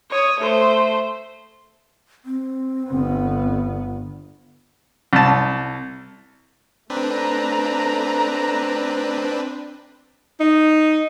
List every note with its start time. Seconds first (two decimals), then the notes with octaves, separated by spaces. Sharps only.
0.10 C#5 D#6
0.40 A3 C5
2.25 C4
2.90 G1 B3
5.13 C2 A5
6.90 A3 C4 D4 B4 A#5
10.40 D#4